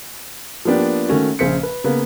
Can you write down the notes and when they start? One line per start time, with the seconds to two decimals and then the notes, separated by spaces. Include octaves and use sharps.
0.65 F3 A#3 B3 D4 G4
1.08 D#3 A3 C#4 F#4
1.39 A#1 C#3 C5 B6 C#7
1.63 B4
1.84 C#3 A#3 B3